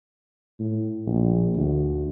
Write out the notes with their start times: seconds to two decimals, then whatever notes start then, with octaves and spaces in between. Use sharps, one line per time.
0.60 A2
1.07 A#1
1.56 D2